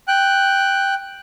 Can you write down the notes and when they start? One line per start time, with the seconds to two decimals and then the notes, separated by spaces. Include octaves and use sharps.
0.08 G5 F#6